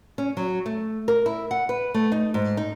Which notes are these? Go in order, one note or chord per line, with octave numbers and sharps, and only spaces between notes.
C#4
F#3
A3
A#4
E4
F#5
B4
A3
D#4
G#2
D#4